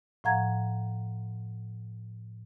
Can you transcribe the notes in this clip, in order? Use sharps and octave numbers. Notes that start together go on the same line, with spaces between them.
A2 F3 F5 F#5 A#5 G#6